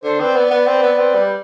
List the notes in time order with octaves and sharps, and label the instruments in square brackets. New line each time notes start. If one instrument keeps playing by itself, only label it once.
[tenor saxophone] D3 [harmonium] A4 C5
[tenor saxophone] C4 [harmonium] B4 D5
[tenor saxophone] B3 [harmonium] B4 D5
[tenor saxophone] B3
C4
B3
C4
G3